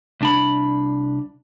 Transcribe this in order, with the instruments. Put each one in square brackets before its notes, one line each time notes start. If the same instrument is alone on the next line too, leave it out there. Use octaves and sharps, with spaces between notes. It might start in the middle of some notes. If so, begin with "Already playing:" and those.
[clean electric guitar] C2 D4 B5